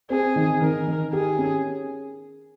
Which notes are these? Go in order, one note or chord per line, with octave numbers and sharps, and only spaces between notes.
C4 G#4
D#3
D#3 A#4
D#3
G4 G#4
C#4